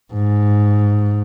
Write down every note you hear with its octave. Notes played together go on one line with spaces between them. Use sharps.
G#2